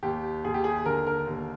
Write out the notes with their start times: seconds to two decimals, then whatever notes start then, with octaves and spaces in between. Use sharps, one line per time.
0.03 D#2 G4
0.44 D#2 G#4
0.54 G4
0.64 G#4
0.86 D3 A#4
1.07 A#4
1.27 D#2